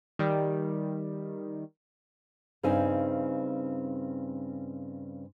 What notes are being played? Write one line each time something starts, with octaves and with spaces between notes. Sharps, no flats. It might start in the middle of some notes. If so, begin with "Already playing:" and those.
D#3 G3
G2 C#3 C4 D#4 D#5 G#5